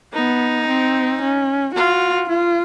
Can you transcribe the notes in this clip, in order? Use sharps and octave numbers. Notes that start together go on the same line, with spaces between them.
B3 D#4
C4
C#4
F4 F#4
F4